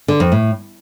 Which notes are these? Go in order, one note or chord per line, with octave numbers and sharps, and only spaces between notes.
D3
F2
A2